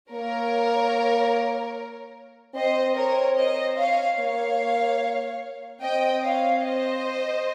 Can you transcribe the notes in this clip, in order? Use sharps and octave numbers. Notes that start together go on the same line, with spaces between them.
A#3 A#4 C#5
C4 C5 D#5
A#4 C#5
C5 D#5
C#5 F5
A#3 C#5 F5
C4 D#5 G5
C#5 F5
C5 D#5